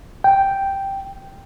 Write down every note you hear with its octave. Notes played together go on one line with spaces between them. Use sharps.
G5